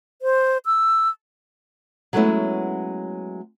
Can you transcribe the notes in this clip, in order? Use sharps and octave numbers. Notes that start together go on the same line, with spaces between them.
C5
E6
F#3 G#3 A3 B3 C#4 E4